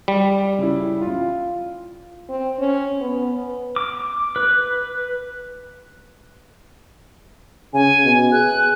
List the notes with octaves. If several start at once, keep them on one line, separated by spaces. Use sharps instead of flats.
G3
C#3 E4
F4
C4
C#4
B3
D6
B4
C#3 G#5
B2
G#4 F#6